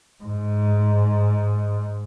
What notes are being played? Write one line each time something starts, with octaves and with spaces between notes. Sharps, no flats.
G#2